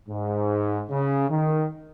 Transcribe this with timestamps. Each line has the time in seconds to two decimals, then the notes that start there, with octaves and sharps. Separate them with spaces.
0.09 G#2
0.90 C#3
1.30 D#3